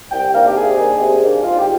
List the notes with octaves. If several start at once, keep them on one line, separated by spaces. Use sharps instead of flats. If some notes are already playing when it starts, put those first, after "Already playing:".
C2 G5
C3 D#3 A#3 D4 F5
G4
C3 G#4
D#3 A#3 D4
C3
D#3 A#3 D4
G#2 F4
G4